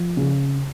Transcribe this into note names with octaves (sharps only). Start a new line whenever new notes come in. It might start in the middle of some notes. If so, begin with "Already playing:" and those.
Already playing: F3
C#3